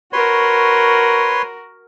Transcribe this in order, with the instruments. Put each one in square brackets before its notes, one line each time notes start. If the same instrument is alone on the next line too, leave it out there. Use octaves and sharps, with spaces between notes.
[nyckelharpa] F#4 A#4 [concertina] B4 C#5 C6